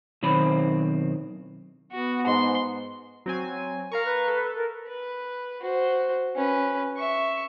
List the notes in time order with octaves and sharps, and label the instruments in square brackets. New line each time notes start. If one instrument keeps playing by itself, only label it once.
[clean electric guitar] B1 D#3 C4 C5 B5
[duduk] B3 [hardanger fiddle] F#4
[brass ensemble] G#2 [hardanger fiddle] C6
[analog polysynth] F#3 C4 G#5
[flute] A#4 [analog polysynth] F5 A#5 C#6
[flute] B4
[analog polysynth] A4
[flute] A#4
[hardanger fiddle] B4
F#4 C5
C#4 B4
E5 C#6